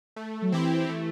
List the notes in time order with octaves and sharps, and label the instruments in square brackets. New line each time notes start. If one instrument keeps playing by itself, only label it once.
[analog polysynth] A3
[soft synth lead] F#3
[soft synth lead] E3 [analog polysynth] C4 E4 G4
[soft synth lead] E3 [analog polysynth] A3